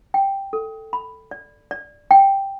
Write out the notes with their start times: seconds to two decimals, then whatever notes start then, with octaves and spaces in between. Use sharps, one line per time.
0.14 G5
0.53 A4
0.93 B5
1.31 D5
1.71 D5
2.11 G5